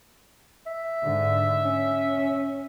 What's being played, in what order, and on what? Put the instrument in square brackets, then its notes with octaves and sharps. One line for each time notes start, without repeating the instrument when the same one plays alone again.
[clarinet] E5
[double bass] G#2 D3
C#4